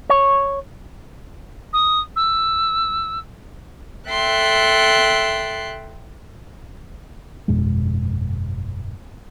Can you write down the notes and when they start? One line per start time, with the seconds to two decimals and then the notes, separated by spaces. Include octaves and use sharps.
0.10 C#5
1.73 D#6
2.16 E6
4.09 A4 E5 G5 C6 F#6
7.48 G1 F2 B2 G#3